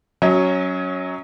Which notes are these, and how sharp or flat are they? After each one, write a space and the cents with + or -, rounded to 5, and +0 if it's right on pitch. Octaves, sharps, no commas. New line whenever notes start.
F#3 +0 C#4 +0 D#5 +45